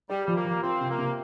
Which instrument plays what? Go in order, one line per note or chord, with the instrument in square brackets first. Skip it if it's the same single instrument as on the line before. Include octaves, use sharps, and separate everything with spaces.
[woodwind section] G3 [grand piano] G4
[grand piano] F3 [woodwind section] G3
[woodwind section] A#3
[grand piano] F3
[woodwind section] C4 [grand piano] F4
[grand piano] C3
[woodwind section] A#3
[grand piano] C3